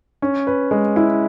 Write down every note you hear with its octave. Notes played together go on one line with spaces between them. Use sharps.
C#4
B4
G#3
E4